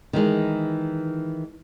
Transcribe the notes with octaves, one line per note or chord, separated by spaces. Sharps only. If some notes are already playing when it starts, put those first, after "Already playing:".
D#3 E3 G#3 D#4